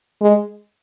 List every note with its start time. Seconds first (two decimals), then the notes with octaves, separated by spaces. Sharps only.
0.21 G#3